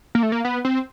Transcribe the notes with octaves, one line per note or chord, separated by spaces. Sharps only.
A#3
A3
A#3
B3
C4